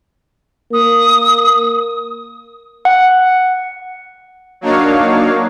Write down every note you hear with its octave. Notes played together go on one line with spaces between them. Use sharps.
A#3 D#6
F#5
F#3 A#3 D4 D#4 C#5 F5